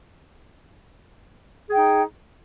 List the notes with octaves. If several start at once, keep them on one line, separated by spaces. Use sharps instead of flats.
D#4 G#4 G5